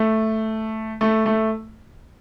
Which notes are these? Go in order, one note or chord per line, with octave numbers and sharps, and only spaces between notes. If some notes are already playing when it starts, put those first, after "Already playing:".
Already playing: A3
A3
A3